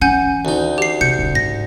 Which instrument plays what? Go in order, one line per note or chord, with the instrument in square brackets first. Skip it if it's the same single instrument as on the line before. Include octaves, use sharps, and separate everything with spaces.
[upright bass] E3 C#4 [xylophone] F#5 G#5 G6
[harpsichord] D2 D#4
[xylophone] G4 C7
[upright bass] C3 [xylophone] G6 C#7
[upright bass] D#1 C#3
[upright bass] G#2 [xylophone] A#6